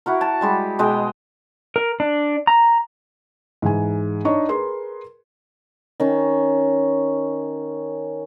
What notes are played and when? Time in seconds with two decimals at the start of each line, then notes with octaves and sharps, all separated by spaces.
0.06 E4 F#4 A#4
0.21 A5
0.41 G3 G#3 G4
0.79 B2 G#3 D#5 G5
1.76 A#4
2.00 D4
2.47 A#5
3.62 G#2 E3 G#5
4.25 D4 D#4 C#5 D#5 C#6
4.49 G#4 A#4 B4 C6
6.00 D#3 C#4